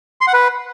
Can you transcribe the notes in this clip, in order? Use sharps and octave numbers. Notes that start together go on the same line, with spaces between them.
C6
F#5
B4